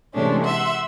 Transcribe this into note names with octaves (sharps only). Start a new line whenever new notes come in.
C3 E3 G#3 A3 C#4 D4
E5 F#5 C6